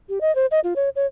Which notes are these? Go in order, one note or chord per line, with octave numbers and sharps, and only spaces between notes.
G4
D#5
C5
D#5
F4
C#5
C#5